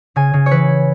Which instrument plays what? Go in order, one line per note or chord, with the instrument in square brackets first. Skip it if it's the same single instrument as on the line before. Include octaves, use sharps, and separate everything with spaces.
[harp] C#3 G#5
C#3
C#5
E3 B4